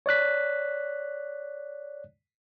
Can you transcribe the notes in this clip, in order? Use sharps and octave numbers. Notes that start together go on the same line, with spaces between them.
C#5 D5 F#6 B6